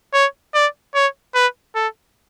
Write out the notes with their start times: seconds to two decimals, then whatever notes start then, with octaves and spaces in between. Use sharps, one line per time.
0.14 C#5
0.54 D5
0.94 C#5
1.35 B4
1.75 A4